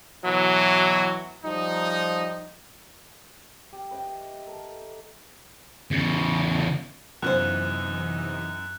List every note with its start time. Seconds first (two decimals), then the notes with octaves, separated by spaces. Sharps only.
0.24 B2 E3 F#3 E4 F#4
1.44 F3 G3 D#4
3.73 G4
3.91 B4 D#5 E5 G5
4.47 A4 A#4
5.91 E2 C#3
7.22 F#2 C3 E3 B3 D#4 F4 C5 F#6